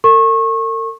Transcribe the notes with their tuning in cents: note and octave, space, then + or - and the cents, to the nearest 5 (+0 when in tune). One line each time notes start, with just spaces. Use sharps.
A#4 -45 C#6 -30